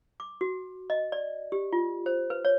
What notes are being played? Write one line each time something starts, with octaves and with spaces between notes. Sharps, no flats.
D6
F#4
D#5
D5
G4
F4
C5
B4
C#5